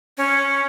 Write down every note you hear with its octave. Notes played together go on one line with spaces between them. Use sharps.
C#4